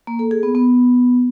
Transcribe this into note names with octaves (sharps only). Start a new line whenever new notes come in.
A#3
A4
G#4
B3
B3